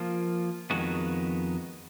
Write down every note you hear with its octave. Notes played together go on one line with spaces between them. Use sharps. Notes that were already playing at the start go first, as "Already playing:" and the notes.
Already playing: F3 A#3 F4
F2 D#3 G#3 B3 F#4